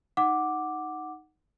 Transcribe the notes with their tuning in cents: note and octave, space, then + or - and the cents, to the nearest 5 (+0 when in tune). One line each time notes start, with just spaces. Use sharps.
D#4 +0 F#5 +0 D6 +0